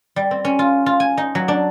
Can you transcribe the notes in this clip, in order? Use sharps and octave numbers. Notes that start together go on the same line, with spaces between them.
G3
C4
C#4
F4
F4
G#5
D#4
F#3
D4